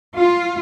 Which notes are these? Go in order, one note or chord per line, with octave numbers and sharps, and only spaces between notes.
F4